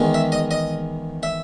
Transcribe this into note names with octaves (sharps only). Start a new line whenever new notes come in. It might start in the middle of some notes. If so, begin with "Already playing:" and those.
Already playing: E2 D#3 G#3 B3
E5
D#5
D#5
E5